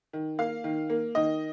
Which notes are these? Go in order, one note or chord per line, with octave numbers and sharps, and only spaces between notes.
D#3
A#3 F5
D#3
A#3
D#3 D#5